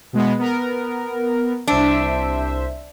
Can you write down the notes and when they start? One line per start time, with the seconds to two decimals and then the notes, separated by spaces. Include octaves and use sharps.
0.13 B2 G#3 B3
0.39 B3 A#4
1.67 C2 D4 C5 E5